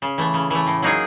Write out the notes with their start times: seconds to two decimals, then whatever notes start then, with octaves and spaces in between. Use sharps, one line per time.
0.02 C#3
0.18 E3 A3
0.34 C#3
0.50 E3 A3
0.67 A2
0.82 F#3 A#3 D#4 G#4